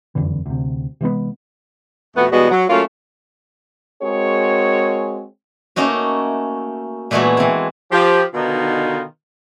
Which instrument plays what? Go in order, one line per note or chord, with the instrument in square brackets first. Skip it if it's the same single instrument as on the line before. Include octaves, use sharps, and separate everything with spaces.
[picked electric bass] F#1 F2 D3 E3
D2 C3
C3 E3 G#3 B3
[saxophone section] F2 B2 A3 B3
E2 B2 G3 G#3 B3 F#4
F#3
F#3 A3 A#3 C#4 F4
[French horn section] G#3 C4 F#4 G#4 A#4 C#5
[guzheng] A3 A#3 C#4 D#4 F#4
A#2 E3 G#3 A3 B3 F#4
E3 C4
[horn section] F3 G4
B2 D3 D#3 B3 D#4 F4